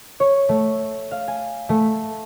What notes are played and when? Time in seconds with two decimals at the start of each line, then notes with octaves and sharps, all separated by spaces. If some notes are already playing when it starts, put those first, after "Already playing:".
0.20 C#5
0.49 A3
1.11 F5
1.28 G#5
1.69 A3